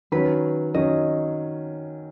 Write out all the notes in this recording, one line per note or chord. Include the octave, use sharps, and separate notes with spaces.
D#3 F#3 C#4 B4
D#3 F#3 C#4 D#5